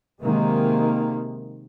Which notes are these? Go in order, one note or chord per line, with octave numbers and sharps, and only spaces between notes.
C3 D#3 G#3 A#3